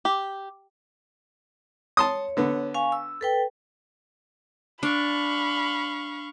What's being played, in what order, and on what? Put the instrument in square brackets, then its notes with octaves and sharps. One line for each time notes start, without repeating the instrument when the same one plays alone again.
[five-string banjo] G4
[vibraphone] C#5 [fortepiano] A5 C6 D#6
[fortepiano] D3 B3
[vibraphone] F5 G#5 C#6
E6
A4 B4 G5
[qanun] D4 [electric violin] F5 C#6 [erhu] B5